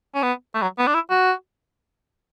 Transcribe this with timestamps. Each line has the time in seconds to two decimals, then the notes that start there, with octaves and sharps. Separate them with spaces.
0.15 C#4
0.23 B3
0.55 A3
0.62 F#3
0.79 B3
0.87 D4
0.95 E4
1.10 F#4